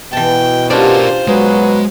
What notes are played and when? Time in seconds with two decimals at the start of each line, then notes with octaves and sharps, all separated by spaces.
0.13 B2 E3 G5 A5
0.70 G3 C#4 D4 F4 A#4 C5 D5
1.28 B2 F#3 G#3 B4